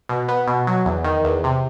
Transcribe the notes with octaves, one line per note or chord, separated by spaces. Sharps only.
B2
B3
B2
F#3
E2
D#3
E2
C3